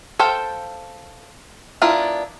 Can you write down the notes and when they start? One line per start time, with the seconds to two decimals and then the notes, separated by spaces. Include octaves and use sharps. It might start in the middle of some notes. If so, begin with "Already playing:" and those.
0.19 A4 C5 F5 G5
1.82 B3 D4 E4 F4 A#4